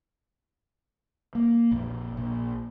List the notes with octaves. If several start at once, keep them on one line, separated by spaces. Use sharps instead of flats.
A#3
A#1 F2
A#1